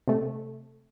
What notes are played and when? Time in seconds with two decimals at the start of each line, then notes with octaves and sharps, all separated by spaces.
0.08 C3 A3